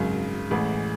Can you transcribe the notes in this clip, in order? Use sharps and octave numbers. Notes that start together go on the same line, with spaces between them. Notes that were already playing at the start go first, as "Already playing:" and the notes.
Already playing: G#1 F#2 C#3
A1 A2 E3 G#3